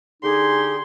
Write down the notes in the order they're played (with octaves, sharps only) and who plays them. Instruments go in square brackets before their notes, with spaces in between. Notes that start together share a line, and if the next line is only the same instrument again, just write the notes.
[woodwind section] D3 D#4 G4 [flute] G#4 [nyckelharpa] C6